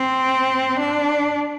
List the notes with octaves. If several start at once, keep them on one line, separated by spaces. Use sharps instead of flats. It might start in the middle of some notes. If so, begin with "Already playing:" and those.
Already playing: C4
D4